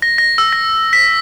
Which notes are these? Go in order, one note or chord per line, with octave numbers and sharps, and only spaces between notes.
A#6
A#6
E6
A#6
B6